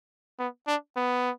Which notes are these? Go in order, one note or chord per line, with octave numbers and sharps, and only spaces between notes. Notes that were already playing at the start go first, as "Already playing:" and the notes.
B3
D4
B3